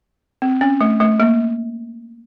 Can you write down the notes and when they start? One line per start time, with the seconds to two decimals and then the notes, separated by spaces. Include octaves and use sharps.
0.42 C4
0.61 C#4
0.81 A3
1.00 A3
1.20 A#3